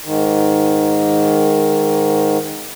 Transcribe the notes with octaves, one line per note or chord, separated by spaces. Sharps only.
G#2 D#3